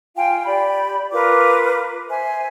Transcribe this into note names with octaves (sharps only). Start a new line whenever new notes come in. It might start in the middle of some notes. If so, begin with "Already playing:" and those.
F4 F5 G5 G#5
G4 D5 B5
F4 A#4 B4 D6
C5 E5 G#5